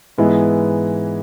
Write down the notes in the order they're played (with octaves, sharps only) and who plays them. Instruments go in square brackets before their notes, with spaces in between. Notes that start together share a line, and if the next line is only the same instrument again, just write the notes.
[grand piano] G#2 E3 G#3 B3 E4